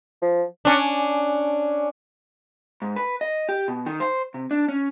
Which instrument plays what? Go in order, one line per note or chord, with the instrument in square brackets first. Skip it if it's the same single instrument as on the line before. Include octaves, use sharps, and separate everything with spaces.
[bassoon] F3
[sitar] C#4 D4
[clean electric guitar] G#2
B4
D#5
G4
B2
D#3
C5
C3
D4
C#4